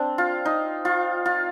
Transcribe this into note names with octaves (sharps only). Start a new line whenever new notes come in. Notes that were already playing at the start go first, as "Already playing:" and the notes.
Already playing: C4 D4
F4
D#4
F4
F4